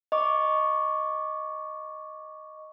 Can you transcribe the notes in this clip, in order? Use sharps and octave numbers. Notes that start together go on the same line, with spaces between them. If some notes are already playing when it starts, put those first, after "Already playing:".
D#5 C#6 D6